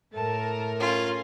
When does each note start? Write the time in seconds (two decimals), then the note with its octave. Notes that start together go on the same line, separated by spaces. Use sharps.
0.14 A2 A3 A#4 A5
0.80 C#4 F4